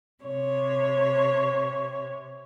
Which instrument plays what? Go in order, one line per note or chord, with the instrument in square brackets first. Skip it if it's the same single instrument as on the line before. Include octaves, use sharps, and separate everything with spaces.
[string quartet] C3 C#5